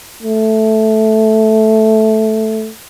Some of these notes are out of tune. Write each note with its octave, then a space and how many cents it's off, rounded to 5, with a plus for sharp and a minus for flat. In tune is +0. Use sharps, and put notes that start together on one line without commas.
A3 -5